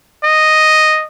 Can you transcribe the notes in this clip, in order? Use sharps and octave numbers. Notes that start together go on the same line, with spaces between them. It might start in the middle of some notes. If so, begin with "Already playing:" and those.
D#5